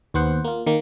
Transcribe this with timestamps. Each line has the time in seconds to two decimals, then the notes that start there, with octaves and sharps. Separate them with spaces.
0.14 D#2 B3 C5 F#5
0.44 A#3 F4
0.66 D#3 A#3